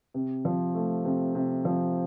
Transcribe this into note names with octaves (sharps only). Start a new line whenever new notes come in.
C3
F3
A3
C3
C3
F3